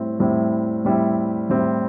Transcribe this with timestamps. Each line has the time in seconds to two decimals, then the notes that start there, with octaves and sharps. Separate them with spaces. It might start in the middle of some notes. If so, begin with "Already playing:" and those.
Already playing: A2 G3 C4 E4
0.20 A2 G3 C4 E4
0.85 A2 G3 C4 E4
1.50 A2 G3 C4 E4